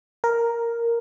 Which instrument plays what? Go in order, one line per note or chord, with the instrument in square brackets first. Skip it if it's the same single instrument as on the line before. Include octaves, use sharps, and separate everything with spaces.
[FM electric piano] A#4